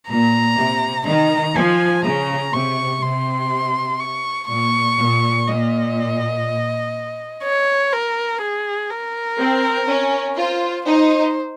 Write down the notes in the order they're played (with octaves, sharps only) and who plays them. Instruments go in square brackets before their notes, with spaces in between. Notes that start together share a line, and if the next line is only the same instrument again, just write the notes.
[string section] A#2 [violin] A#5
[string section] C3
[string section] D#3 [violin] A#5
[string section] F3 [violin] G#5
[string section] C#3 [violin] A#5
[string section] C3 [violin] C#6
[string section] C3 [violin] C6
[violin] C#6
[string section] A#2 [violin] C#6
[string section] A#2
[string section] A#2 [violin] D#5
[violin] C#5
A#4
G#4
A#4
[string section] C4
C#4
[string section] F4 [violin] C5
[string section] D#4 [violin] C5